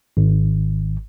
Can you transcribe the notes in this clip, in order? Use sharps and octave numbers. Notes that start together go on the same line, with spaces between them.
G#1